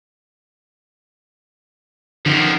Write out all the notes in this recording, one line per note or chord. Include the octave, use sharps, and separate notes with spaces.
F#2 D#3 F3